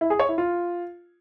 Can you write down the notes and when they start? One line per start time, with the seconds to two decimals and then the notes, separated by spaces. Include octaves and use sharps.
0.01 E4
0.10 G#4
0.19 C#5
0.29 E4
0.38 F4